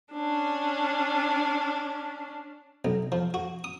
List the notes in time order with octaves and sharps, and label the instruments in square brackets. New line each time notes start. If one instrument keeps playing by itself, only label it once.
[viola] C#4 D4
[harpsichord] B1
F3
F#4
D#6